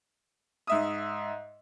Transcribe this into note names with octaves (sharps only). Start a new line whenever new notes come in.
G#2 E5 D#6